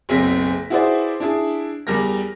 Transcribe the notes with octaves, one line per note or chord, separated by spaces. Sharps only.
F#1 B1 B3 C4 A#6 B6
E4 F#4 G#4 B4 C5 D5
D4 E4 G#4
E2 G3 G4 A#4 A#6